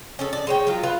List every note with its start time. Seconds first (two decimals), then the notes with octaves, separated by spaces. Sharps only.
0.19 C#4 G#4 A4
0.33 D5
0.47 G#3 C#5 G5
0.67 F#3 F4
0.83 F4 B4